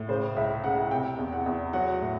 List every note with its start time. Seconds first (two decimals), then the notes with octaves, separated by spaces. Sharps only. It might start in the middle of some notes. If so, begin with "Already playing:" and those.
Already playing: A2
0.08 C#3 C5
0.36 C#2 E5
0.64 C#3 F#5
0.91 C3 G5
1.18 E2
1.32 F#5
1.46 E2
1.73 F#3 F#5
2.01 A2